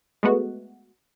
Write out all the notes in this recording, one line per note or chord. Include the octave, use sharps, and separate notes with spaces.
G#3 A3 B3 F#4